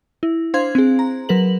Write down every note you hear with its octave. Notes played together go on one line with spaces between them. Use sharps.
E4
D4 C5 F5 C6 G#6
C4 G#4
A#5
F#3 A#4 B4 F#7